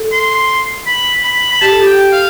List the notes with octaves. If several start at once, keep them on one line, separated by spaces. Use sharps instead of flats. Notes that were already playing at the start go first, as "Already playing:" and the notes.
Already playing: A4
C6
B5
B5
B5
G4 A5
A4
G4
G5
F5